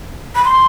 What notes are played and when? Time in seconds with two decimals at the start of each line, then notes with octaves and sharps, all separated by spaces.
0.36 B5
0.45 C6